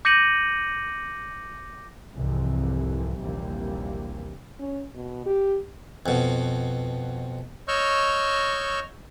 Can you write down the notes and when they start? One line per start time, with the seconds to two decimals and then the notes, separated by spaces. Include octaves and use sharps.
0.05 D6 G6 A#6 C#7 D#7 F#7
2.13 C2 F2 G#2 C3 E3
3.18 A#1 D#2 C3 E3 G3 A#3
4.60 C#4
4.95 B2
5.26 G4
6.06 F2 B2
7.68 C#5 D#5 C#6 E6 F6 G6